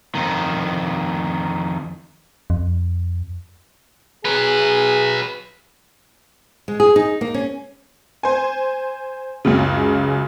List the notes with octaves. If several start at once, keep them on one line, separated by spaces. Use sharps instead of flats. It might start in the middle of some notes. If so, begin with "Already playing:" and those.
F2 D#3
F2
F#3 G#4 B4
G#3
G#4
D#4
A#3
C#4
C5 G#5
C#2 F#2 C#3